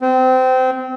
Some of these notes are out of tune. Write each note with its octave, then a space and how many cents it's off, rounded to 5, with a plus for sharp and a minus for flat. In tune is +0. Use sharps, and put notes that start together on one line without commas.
C4 -25